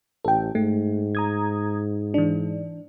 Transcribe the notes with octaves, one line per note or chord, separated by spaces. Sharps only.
A1 A4 G5
G#2 A3
A#5 D#6 G#6
E3 D4